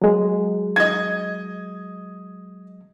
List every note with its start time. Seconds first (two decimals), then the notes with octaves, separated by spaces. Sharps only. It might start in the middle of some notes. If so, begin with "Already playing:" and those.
0.02 F#3 G#3
0.76 D#5 G#6